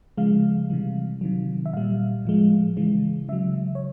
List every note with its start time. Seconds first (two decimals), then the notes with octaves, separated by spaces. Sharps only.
0.18 C#3 F3 G#3 F5
0.70 C3 E3 G3
1.21 C3 D#3 F#3
1.66 E5
1.73 A#2 G3 F5
2.25 A2 F3 G#3
2.77 C#3 E3 G#3
3.29 C#3 F#3 E5
3.75 C#5